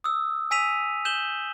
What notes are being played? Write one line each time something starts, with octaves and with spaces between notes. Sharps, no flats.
D#6 E6
G#5 E6 B6 D#7 F7
G6 E7 F#7 G7